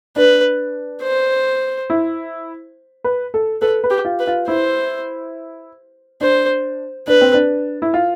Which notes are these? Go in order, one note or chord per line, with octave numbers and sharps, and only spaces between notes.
D4 B4
C5
E4
B4
A4
A4 B4
B4
G4
F4
B4
F4
E4 C5
D4 C5
D4 B4
C4
D4
E4
F4